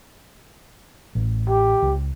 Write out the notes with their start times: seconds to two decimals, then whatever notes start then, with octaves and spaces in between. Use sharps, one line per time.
1.15 A1
1.49 G4
1.82 C#2